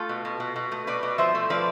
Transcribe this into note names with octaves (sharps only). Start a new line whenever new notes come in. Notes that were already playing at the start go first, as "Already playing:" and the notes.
Already playing: A3 F4 A4
B2
B2
B2
B2
A3
B2 B4 D5
B2
F3 C5 E5
A3
F3 B4 D5